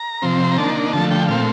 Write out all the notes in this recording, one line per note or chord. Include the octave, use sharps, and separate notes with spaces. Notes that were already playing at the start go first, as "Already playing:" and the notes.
Already playing: A#5
C3 F3 C4
A#5
D#3 A#3 D4 A5
D3 F3 A3 A5
G5
A#2 A3 C4 F5